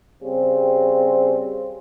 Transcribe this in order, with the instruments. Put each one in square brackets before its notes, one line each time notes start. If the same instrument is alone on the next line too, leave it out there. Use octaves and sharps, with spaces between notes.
[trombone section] C#3 G3 C4